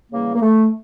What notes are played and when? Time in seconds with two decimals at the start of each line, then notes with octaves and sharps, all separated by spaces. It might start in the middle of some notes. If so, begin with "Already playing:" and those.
0.11 C#3 E3 G3 A#3
0.34 A#3
0.40 A3